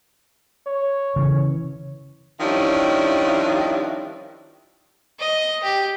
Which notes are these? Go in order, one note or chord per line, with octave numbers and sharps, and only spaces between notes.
C#5
C#3 E3
D#3 F3 G3 C#4 D4 E4
D#5
G4